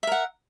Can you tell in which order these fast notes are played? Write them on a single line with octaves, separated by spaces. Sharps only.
E5 A#4 F#5